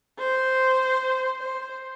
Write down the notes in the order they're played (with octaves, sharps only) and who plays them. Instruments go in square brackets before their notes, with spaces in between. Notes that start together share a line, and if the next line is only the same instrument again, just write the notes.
[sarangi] C5
C5